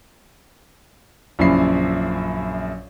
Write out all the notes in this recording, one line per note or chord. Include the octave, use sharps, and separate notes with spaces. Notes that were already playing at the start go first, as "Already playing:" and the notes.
A#1 F#2 C#3 E4 B5 C7